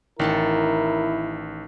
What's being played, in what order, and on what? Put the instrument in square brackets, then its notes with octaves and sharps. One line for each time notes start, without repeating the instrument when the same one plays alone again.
[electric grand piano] A1 [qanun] D#3 F#5 A5 [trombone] E4 [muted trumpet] A#4